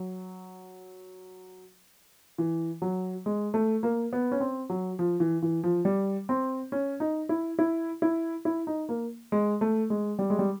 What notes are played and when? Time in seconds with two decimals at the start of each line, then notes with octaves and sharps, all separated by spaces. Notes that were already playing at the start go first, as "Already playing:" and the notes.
Already playing: F#3
2.38 E3
2.82 F#3
3.26 G#3
3.54 A3
3.83 A#3
4.13 B3
4.32 C#4
4.40 C4
4.70 F#3
4.99 F3
5.20 E3
5.42 E3
5.64 F3
5.85 G3
6.29 C4
6.72 C#4
7.00 D#4
7.29 E4
7.59 E4
8.02 E4
8.45 E4
8.67 D#4
8.89 A#3
9.32 G#3
9.61 A3
9.90 G#3
10.19 G3
10.30 G#3
10.39 G3